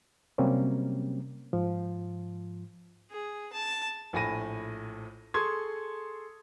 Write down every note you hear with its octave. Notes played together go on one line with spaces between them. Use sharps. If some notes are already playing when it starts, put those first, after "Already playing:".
C3 F#3 G3 A#3 C4 C#4
G#2 F3
G#4
A5
A#1 A2 G#5 B5 A#6 D#7
G#4 A4 C6 C#6 D#6 G#6